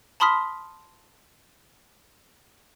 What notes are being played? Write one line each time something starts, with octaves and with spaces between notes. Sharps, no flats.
A5 B5 C6 D#6 F6 B6